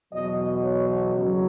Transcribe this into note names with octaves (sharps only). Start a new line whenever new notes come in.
E2 B2 F#3 D#5
C#5
E2 C#3 F#3